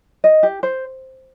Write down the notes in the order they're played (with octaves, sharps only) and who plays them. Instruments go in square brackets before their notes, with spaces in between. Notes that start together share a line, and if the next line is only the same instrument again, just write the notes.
[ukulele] D#5
G4
C5